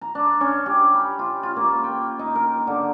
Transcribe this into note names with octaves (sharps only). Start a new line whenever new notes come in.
A#5
D4
C#4
G4
B5
F4
F4
A#3
G5
D#4
A#4
D3